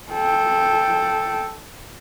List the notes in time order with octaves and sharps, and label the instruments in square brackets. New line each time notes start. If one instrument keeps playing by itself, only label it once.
[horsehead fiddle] A4 G5